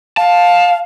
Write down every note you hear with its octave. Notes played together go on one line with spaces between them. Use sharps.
F5 A5